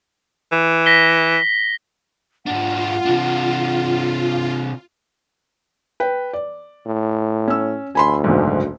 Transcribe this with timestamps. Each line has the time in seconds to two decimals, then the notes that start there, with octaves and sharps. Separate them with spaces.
0.52 E3
0.86 A#6 B6 G7
2.46 G#2 D4 F4 F#5
3.05 C3 D4
6.00 B4 G5
6.33 D5
6.86 A2
7.48 C#4 E6
7.95 D2 G#5 B5 C6
8.24 F#1 B1 G#2